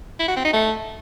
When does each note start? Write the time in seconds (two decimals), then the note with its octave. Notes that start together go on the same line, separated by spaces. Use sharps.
0.20 E4
0.28 F#4
0.36 C4
0.45 D#4
0.53 A3